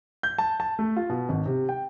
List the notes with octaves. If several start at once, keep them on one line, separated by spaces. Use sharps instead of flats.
G6
A5
A5
A3
F4
B2
G#1
C3
G5